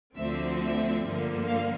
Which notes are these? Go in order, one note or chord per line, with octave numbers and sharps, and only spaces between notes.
D2 D3 F3 C4 E5
E5
G2 D3 F3 A#3
F5